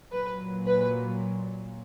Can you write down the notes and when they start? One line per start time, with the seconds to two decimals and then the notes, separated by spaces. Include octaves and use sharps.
0.11 A#2 F#3 B4
0.67 B4